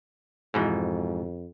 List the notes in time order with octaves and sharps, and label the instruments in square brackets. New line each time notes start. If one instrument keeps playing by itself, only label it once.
[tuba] F2 [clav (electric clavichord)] G#2 B2 E3